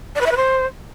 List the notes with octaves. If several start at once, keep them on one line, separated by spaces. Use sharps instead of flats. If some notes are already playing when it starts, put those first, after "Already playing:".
D5
B4
E5
B4
C5